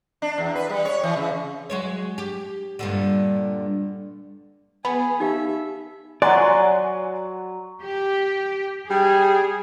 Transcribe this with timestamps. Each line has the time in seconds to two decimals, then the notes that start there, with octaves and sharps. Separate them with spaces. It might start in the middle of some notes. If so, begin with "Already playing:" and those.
0.22 D4
0.38 E2
0.55 B4
0.70 G3
0.85 C#5
1.03 E3
1.16 C#3
1.70 F#3 G#3 C#5
2.18 G4
2.79 G2 A#2 D3
4.85 B3 G#4 B5
5.20 D#4 G4 E5 F5
6.22 F#3 D5 G#5 B5 C6 F#6
7.80 G4
8.90 G3 G#4